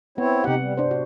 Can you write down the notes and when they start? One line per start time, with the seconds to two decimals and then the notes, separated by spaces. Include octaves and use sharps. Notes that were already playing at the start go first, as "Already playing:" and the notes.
0.18 B3 C4 E4 C#5
0.44 C3 D#4 G4 F#5
0.61 G3
0.77 G2 D4 C5
0.91 A2 F#4